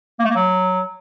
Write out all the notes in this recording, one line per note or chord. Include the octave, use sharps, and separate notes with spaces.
A#3
A3
A#3
F#3